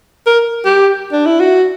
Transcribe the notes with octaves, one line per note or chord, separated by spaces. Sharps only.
A#4
G4
D4
E4
F#4